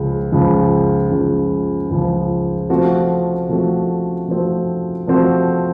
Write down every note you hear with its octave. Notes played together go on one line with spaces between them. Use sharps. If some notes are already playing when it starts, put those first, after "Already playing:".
Already playing: C#2 C#3 F3
C#2 C#3 F3
C#2 C#3 F3
C#2 C#3 F3
C3 F3 A3 C4 F#4
C3 F3 A3 C4 F#4
C3 F3 A3 C4 F#4
C3 F3 A3 C4 F#4